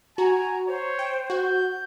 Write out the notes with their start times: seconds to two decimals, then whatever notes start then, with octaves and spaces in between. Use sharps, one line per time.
0.18 F#4 G#5 A#5
0.68 C5 C#5
0.99 G5
1.30 F#4 G6